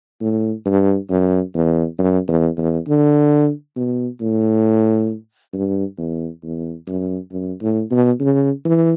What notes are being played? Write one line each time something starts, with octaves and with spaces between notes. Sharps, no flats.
A2
G2
F#2
E2
F#2
E2
E2
D3
B2
A2
G2
E2
E2
F#2
F#2
A2
B2
C#3
E3